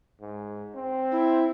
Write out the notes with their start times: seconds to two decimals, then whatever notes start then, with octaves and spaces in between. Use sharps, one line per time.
0.21 G#2
0.75 C4
1.11 E4